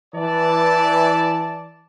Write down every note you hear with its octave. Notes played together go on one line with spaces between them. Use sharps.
E3 D5 A5